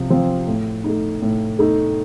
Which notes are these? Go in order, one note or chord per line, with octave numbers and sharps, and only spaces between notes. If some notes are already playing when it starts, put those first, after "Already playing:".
Already playing: C3 F3
F3 C4
A2
A3 D#4
A2
A3 D#4